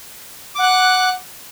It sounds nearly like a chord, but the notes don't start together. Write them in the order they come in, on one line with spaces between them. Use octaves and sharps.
D6 F#5 F#6